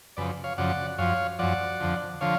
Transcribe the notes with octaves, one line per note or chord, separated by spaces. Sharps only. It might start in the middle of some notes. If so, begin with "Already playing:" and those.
F#2 C#3 F3 B4 D5
C#5 F5
F#2 C#3 F3 D5 F#5
F#2 F3 C#5 F5
F#2 F3 D5 F#5
F2 D3 F3
D3 F3 C#5 F5